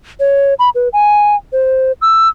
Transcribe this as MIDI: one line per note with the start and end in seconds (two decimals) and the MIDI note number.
0.20 0.54 73
0.59 0.70 83
0.75 0.89 71
0.93 1.36 80
1.53 1.92 72
2.02 2.28 88